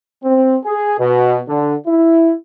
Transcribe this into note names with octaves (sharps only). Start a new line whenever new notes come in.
C4
G#4
B2
D3
E4